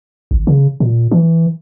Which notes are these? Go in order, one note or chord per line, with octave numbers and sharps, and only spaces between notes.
G#1
C#3
A#2
E3